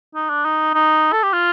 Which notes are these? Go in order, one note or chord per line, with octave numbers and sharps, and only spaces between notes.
D#4
D4
D#4
D#4
A4
G4
F4